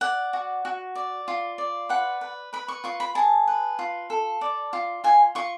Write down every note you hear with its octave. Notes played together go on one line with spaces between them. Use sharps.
D5 F#5
F#4
F#4
D5
F4
D5
B4 F#5
B4
B4 B5
C#6
F4 C#6
B5
G#4 A5
B4
F4
A4
D5
F4
F4 G#5
F4 C#6